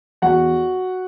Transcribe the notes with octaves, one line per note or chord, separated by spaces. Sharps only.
E2 F#4 F#5